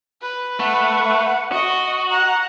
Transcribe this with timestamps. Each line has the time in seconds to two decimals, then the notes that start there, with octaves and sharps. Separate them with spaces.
0.22 B4
0.60 A3 F#5
1.52 F#4 D#5 C#6
2.10 F#5 A#5